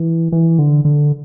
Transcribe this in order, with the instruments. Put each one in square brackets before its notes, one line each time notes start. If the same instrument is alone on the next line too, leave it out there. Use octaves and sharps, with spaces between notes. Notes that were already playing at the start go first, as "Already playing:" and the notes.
Already playing: [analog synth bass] E3
E3
D3
D3